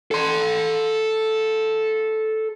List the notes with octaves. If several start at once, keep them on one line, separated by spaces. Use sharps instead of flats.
A4 C6